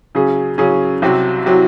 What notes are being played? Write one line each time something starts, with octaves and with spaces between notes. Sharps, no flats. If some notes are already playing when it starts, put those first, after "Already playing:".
C#3 F#3 C#4 G#4
C#3 F#3 C#4 G#4
C2 C3 F#3 C4 F#4
C3 F#3 C4 F#4